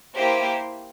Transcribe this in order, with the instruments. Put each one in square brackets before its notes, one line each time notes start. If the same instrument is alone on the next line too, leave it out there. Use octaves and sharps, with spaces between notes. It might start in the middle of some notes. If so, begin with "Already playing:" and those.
[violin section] A#3 E4 G4 C5